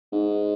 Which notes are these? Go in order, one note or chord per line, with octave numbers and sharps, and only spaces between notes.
G#2